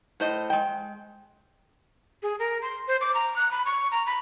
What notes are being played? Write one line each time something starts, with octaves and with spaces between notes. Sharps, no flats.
A2 C5 D#5
G#3 G5
G#4
A#4
C6
C5
D6
A#5
F#6
B5
C#6
A#5
B5